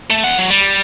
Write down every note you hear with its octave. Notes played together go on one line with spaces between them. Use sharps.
A3
E2 F#5
F#3
G3